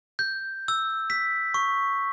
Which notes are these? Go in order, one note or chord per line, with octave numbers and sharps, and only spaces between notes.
G6
E6
B6
C#6